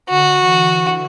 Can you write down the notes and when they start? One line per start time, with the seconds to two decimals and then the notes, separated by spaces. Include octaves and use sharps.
0.09 D3 F#4
0.38 E3